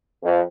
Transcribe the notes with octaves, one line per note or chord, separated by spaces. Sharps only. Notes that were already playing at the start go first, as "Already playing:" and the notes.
F2